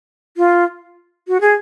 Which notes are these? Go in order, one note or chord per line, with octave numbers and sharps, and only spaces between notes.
F4
F#4
G#4